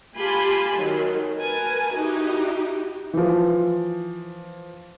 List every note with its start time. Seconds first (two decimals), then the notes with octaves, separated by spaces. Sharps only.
0.18 F4 G4 G#5 A5 B5 C6
0.74 D#3 F#3
1.37 A#4 B4 G#5 A5
1.94 D#4 E4 F#4 G4
3.13 E3 F3